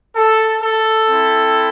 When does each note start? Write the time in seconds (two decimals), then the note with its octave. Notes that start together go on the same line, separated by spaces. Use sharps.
0.15 A4
0.61 A4
1.07 C4 E4